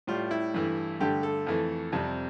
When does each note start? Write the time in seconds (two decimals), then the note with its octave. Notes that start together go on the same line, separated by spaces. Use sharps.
0.07 A2 G3 F4
0.31 E4
0.54 G2 E3 A3
1.00 G2 D3 A3 G4
1.23 A4
1.47 F2 E3 A3
1.92 F2 C3 G3